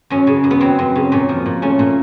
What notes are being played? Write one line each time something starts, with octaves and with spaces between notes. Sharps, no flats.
F#2 C#4
C#3
F#2
B3
F#3 C4
F#2
C#3
A#2 C#4
F3
A#2
A3 C#4
A#2